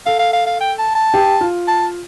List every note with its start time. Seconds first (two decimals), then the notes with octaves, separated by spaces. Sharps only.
0.06 A4 F5
0.19 F5
0.33 F5
0.46 F5
0.60 G5
0.78 A5
0.95 A5
1.14 G4
1.41 F4
1.68 A5